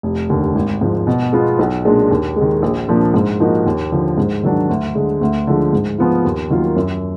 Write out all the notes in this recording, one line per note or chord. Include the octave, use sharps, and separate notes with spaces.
F1
D#2 D3
G#1
G#2 F3
B2
G#3 B3 F4
B1
A#2 G#3 D4
D#2
D#3 G#3
A#1
A#2 F3 A#3 D4
G#2
F3 A#3 D#4 F#4
D#2
D3 F3
G#2
D#3 F#3 D4
D2
D3 G#3
D2
D3 F3 G#3
G#2
F3 B3 F4
D#2
D#3 F#3 A#3 F4
F#2